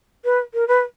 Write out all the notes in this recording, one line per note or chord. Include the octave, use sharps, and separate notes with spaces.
B4
A#4
B4